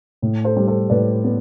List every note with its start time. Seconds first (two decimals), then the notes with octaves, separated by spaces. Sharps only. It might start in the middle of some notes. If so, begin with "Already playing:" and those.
0.22 A2
0.45 A4 C5
0.56 G3
0.67 A4 C5
0.90 A2 B4 D5
1.24 B3